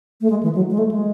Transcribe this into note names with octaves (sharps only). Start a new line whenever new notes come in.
A3
G#3
E3
F#3
G#3
A3
G#3